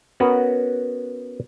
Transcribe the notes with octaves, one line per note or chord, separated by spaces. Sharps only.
B3 C#4 F#4 A#4 B4